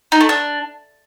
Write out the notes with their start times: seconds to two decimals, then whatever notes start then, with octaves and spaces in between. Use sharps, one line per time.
0.12 D#4
0.21 A3
0.29 D4